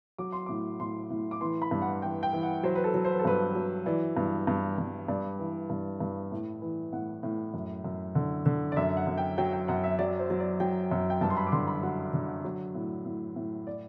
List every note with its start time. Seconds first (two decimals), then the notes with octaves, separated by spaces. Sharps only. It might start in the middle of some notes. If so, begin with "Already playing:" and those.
0.18 F#3 D6
0.32 C6
0.46 A2 D6
0.80 A2 C6
1.10 A2
1.31 D6
1.41 E3 C6
1.62 B5
1.71 G2
1.82 F#5
2.02 E3 G5
2.23 G5
2.33 E3
2.43 F#5
2.63 F#3 C5
2.75 B4
2.84 A4
2.94 F#3
3.05 C5
3.12 B4
3.19 A4
3.25 G2 B4
3.55 F#3
3.86 E3 D5
4.17 G2
4.47 G2
4.78 G2
5.08 G2 D5
5.39 E3
5.70 G2
6.00 G2
6.32 A2
6.62 E3
6.93 A2 F#5
7.23 A2
7.54 F#2
7.84 F#2
8.15 D3
8.46 D3
8.72 D5
8.76 F#2 E5
8.97 F#5
9.07 F#2
9.18 G5
9.38 F#3 G5
9.53 G5
9.68 F#2 F#5
9.84 E5
9.99 F#3 D5
10.19 C5
10.30 F#3
10.40 D5
10.60 F#3 G5
10.91 F#2
11.10 G5
11.21 G2 A5
11.30 C6
11.37 B5
11.47 D6
11.52 D3 C6
11.68 B5
11.83 F#3 F#5
12.13 D3
12.44 F#3
12.75 A2
13.06 A2
13.36 A2
13.67 D5